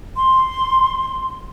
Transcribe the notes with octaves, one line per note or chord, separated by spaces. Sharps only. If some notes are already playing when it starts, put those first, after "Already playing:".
C6